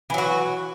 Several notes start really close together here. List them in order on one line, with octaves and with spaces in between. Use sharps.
E3 F#3 F#4